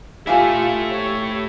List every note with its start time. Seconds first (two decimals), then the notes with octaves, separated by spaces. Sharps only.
0.27 E3 A3 E4 F4 G4 F5 G#5
0.91 C#5